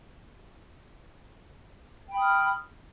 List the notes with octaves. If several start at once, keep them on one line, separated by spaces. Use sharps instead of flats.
G5 B5 D#6 F6